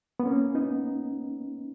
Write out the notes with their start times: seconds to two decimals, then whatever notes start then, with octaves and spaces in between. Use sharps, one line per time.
0.20 B3
0.26 A#3 C#4
0.55 B3 D#4